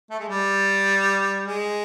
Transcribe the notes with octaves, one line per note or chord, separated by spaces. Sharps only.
A3
G#3
G3
G#3